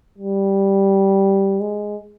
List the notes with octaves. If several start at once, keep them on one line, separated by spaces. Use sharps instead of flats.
G3
G#3